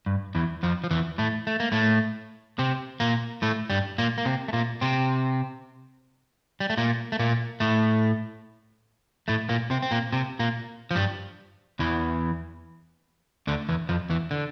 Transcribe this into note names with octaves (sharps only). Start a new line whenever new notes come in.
G2
E2 E3
F2 F3
F3
E2 E3
A2 A3
A3
A#3
A2 A3
C3 C4
A#2 A#3
A2 A3
G2 G3
A#2 A#3
A#3
C3 C4
A3
A#2 A#3
C3 C4
G3
A3
A#2 A#3
A3
A#2 A#3
A2 A3
A2 A3
A#2 A#3
C3 C4
C4
A#2 A#3
C3 C4
A#2 A#3
F3
G2 G3
E2 E3
D2 D3
E2 E3
F2 F3
E2 E3
D3